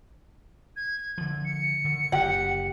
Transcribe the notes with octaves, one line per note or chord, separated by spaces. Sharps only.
G#6
D3 F3
C#7
D3 D#3
F#1 G4 F#5